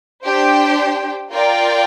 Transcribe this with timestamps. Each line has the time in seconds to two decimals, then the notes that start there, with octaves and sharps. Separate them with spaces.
0.24 D4 G4 C5 G5
1.30 F4 A#4 D5 G5